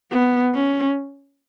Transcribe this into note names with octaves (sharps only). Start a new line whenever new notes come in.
B3
C#4